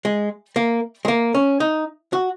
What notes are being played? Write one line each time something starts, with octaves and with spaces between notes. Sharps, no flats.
G#3
A#3
G#3
A#3
C#4
D#4
F#4